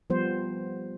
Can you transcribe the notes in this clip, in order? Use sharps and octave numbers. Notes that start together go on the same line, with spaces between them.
F3 G3 B3 C5